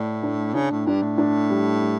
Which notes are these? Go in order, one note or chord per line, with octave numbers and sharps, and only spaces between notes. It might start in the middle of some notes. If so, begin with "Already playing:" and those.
Already playing: A2 A3 D5
D4
C#3 D4
A2
G2 D4
A2
D4
G3
G3